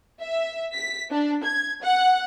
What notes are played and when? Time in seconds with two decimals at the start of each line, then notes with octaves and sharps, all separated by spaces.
0.22 E5
0.74 B6
1.11 D4
1.44 G#6
1.83 F#5